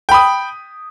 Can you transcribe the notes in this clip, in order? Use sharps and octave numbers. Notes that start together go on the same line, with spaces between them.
G5 B5 D#6